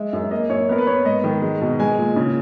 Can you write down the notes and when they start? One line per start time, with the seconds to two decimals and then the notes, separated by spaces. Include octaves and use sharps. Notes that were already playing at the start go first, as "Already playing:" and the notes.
Already playing: G#3 E5
0.13 F#2
0.31 A#3 D#5
0.49 F#2 C#5
0.69 B3 A#4
0.78 B4
0.87 B3 C#5
0.96 B4
1.05 G#2 D#5
1.24 D#3
1.42 G#3
1.61 B2
1.79 G#3 G#5
1.98 A#2
2.16 C#3